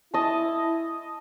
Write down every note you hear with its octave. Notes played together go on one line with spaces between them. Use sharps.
E4 D#5 A5